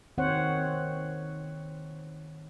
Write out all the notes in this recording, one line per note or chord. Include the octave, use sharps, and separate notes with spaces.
D#3 C4 C5 C#5 F#5